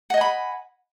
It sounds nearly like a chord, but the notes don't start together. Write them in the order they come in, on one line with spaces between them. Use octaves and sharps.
F#5 D#5 G#5 B5